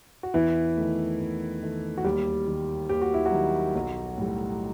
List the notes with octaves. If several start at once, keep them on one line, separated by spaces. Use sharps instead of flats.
F#4
E2 E3 E4
D#3 A3
E2
D#3 A3
F#4
D#2 G3 G4
D#3 G3
D#2 G4
F#4
E4
F#3 F#4
D#3 G3
B1
A2 G3